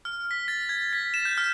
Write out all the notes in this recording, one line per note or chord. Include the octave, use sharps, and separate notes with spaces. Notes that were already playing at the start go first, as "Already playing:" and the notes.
F6
B6
A6
G#6
B6
E7
G6
F6